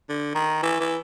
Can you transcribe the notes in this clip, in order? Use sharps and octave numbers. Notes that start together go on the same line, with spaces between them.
D3
D#3
E3
E3